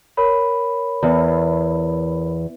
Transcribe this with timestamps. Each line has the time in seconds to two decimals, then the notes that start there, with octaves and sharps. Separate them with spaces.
0.17 A#4 C#5 B5
1.03 E2